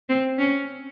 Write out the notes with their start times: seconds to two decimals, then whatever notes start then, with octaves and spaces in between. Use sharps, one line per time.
0.09 C4
0.39 C#4